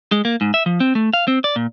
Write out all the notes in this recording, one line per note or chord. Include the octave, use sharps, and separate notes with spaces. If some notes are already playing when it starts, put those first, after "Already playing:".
G#3
A#3
G#2
E5
F3
C4
A3
F5
C4
D5
A#2